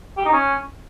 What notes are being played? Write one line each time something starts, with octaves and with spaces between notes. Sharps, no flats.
G4
D#4
C#4